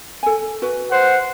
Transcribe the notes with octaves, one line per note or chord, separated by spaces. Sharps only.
A4 G#5
F#4 B4
C5 F#5